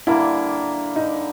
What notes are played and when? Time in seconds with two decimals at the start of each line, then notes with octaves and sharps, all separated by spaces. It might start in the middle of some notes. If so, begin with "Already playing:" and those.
0.07 D3 G3 A#3 E4
0.96 D#4